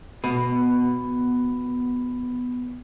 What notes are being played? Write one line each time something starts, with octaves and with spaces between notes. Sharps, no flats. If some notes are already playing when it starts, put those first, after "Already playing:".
B2 B3